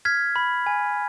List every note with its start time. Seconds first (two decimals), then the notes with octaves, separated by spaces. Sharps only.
0.05 F6 G#6 B6
0.36 B5
0.66 G#5